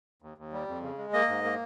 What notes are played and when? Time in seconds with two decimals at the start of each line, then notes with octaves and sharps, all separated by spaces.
0.22 D#2
0.38 D#2
0.52 G3
0.68 F2
0.82 C#3
0.98 G#3
1.13 A#3 D#5
1.28 G#2
1.44 A#3